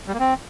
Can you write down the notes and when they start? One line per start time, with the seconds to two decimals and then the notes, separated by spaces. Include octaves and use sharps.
0.08 G3
0.14 A#3
0.20 C4